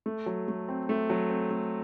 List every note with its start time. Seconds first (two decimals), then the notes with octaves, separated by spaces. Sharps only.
0.06 A3
0.26 F#3
0.48 A3
0.68 C4
0.89 A3
1.10 F#3
1.30 C4
1.51 A3